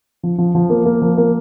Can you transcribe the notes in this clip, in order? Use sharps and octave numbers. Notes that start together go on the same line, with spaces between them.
F3
F3
F3
A#3
A#3
F3
A#3